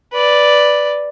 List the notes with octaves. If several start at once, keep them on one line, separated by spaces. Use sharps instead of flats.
B4 D5